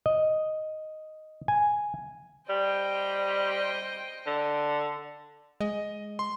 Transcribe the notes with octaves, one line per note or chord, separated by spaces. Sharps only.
D#5
G#5
G3 C5 D#5 G5
D3
G#3 D#5
C6